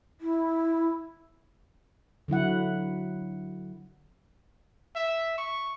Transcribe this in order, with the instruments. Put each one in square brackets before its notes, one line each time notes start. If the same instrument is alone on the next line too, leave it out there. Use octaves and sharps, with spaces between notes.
[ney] E4
[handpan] D3 F#3 E4 F#5
[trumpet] E5
C#6